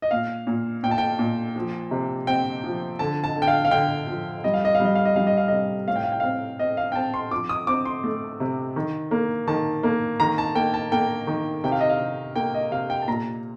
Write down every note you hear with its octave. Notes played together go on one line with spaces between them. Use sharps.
D#5
A#2 F5
A#2
A#2 G5
A5
G5
A#2
F3
C3
C4 G5
F3
D3 A5
A5
D3
G5
F5
F5
D3 G5
F3
G3 D#5
F5
D#5
F5
G3
D#5
F5
D#5
G3 F5
D#5
F5
C3 D#5
A2 F5
G5
F5
G5
C4 F5
C4 D#5
F5
G5
C4 A5
C6
F3 D6
D#6
C4 D6
C6
A3
C3
D#3
A#3
D#3 A5
A#3
D#3 A#5
A5
A#3 G5
A5
A#3 G5
D#3
C3 G5
F5
D#5
F5
C3
A#3 G5
D#5
C3 F5
G5
A5
A#2 A#5